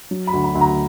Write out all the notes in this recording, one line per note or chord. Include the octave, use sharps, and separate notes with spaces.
F#3
B5
D2
B5
D2
A#5